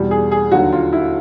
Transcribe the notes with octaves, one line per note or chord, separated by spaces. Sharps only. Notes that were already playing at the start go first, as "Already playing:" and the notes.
Already playing: E2 B2 G3
G#4
G#4
D#2 D3 F#3 F#4
F4
E4